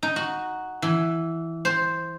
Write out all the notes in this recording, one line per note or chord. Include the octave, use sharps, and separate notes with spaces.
D#4
F#4
E3
C5